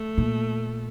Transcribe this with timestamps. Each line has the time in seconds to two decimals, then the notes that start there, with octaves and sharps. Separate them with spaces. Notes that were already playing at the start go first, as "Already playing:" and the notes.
Already playing: A3
0.18 A#2